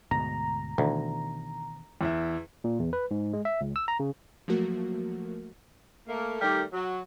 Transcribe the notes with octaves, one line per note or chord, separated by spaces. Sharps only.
D2 G#2 B2 A#5
D2 B2 D#3 E3
E2 E4 E5
A#2
E2
B4
G#2
G#3
E5
C#2
E6
A#5
C#3
F3 F#3 A3 A#3 F#4 A#4
A3 A#3
D#3 G3 A3 G4 A#4
F#3